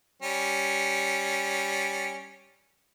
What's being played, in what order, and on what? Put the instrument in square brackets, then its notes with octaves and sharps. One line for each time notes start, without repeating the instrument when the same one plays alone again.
[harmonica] G3 C#4